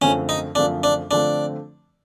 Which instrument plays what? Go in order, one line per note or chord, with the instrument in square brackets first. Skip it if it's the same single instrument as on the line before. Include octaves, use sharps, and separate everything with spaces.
[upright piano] F#2 D3 F3 A3 C4 [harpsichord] C#4
[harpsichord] D#4
[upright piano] F#2 D3 F3 A3 C4 [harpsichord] D4
[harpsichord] D4
[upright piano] D3 F3 A3 C4 [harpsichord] D4